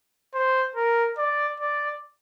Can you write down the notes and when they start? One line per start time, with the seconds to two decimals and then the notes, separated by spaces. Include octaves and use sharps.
0.34 C5
0.76 A#4
1.18 D5
1.60 D5